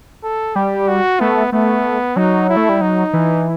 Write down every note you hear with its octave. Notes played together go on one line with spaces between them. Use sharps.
A4
G3 G4
F#4
A3 B3
A3 B3
F#3 D#4
E4
A3
G3
F#3 D#4
E3